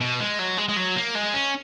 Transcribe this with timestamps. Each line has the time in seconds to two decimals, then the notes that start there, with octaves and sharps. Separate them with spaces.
0.01 B2
0.20 G#3
0.39 F#3
0.58 G#3
0.69 G#3
0.77 F#3
0.96 A#3
1.15 G#3
1.34 C#4